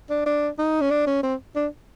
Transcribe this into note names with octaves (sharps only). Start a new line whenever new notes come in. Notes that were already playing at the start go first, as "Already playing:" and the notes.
D4
D4
D#4
C#4
D4
C#4
C4
D4